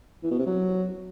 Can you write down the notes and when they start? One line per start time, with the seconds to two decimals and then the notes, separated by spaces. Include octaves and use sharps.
0.23 E3
0.31 B2
0.39 C3
0.46 F#3